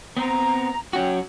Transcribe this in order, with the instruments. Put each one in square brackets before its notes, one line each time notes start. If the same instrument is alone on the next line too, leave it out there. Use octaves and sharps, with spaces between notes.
[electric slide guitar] B3 C4 [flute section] A#5
[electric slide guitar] F#3 C#4 F#4 [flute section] G5